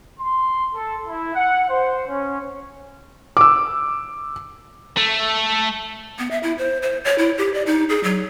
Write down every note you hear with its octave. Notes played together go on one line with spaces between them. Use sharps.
C6
A4
E4
F#5
C5
C#4
D6 E6
A3
B3
E5
E4
C5
C5
C#5
E4
G4
D5
D#4
G#4
F#3